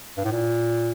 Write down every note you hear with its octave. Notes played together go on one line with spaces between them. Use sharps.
G2
A2
A#2